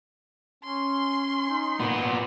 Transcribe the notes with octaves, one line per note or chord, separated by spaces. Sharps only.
C#4 C6
D#4
A#2 B3